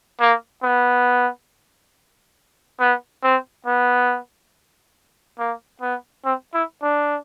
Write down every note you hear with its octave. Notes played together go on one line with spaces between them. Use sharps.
A#3
B3
B3
C4
B3
A#3
B3
C4
E4
D4